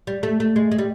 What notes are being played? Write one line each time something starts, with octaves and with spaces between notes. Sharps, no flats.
G3
A3
A3
G#3
G#3
G3